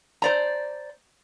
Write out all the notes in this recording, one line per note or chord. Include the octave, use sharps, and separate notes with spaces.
C5 D5 A#5